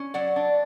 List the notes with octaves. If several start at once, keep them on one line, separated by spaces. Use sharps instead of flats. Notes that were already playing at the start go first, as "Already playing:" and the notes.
Already playing: C#4
F#3 D5 F#5
D4